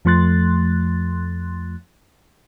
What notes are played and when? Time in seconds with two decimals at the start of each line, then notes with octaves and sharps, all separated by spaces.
0.05 F2 F3 A3 C6 F#6 A6